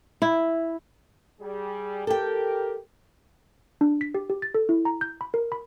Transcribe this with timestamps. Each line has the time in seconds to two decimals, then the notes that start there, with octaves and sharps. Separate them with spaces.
0.22 E4
1.41 G3 G#4
2.07 G4 A4 A#4 G5
3.81 D4
4.01 B6
4.15 G4
4.30 G4
4.42 A6
4.54 A4
4.69 E4
4.85 A#5
5.01 G6
5.21 B5
5.34 A#4
5.52 B5